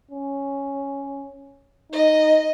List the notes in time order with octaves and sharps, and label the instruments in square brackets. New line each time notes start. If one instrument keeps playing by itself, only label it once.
[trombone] C#4
[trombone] D#4 [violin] D#5